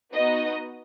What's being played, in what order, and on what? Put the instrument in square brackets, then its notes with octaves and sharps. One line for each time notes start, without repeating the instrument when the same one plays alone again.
[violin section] B3 D#4 F#4 D#5